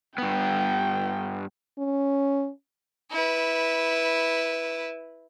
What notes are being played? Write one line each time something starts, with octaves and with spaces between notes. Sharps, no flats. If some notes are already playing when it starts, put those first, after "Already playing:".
G2 B3 G5
C#4
E4 B4